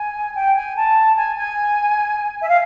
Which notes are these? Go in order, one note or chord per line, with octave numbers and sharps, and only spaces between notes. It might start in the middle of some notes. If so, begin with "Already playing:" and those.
Already playing: G#5
G5
G#5
A5
G#5
G#5
E5
F5